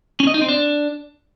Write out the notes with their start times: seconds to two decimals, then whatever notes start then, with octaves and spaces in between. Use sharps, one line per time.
0.20 C#4
0.27 D#5
0.34 D#4
0.41 C4
0.49 D4